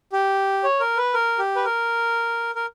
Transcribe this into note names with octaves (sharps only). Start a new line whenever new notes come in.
G4
C#5
A#4
B4
A#4
G4
B4
A#4
A#4